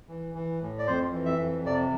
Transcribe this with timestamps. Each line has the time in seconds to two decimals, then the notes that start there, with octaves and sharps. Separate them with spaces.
0.08 E3
0.34 E3
0.61 A2
0.79 D5
0.87 F2 C5
1.13 E3
1.26 E5
1.39 F2
1.65 C3 D5